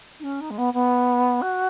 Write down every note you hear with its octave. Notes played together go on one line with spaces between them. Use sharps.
D#4
C#4
D#4
G#3
B3
B3
F#4